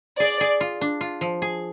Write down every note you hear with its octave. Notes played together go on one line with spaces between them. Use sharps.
G#4 D5
G#4
F4
D4
F4
F3
G#4